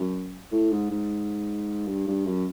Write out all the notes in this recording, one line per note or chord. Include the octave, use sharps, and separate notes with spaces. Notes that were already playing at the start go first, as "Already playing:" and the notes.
Already playing: F#2
A2
G#2
G#2
G2
G2
F#2